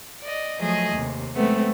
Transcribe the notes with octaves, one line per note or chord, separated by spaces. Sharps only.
D5 D#5
F3 F#3 A3 G#4 D#5
D#2 C3
F#3 G#3 A3 B3 C4